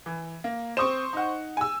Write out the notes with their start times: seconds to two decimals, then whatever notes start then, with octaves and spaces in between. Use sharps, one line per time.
0.06 E3
0.44 A#3
0.77 C4 C5 C#6 D#6 E7
1.13 D#4 F#5
1.57 G#5 E6